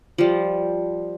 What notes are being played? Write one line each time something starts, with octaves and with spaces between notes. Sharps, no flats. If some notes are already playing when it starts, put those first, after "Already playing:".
F3 G3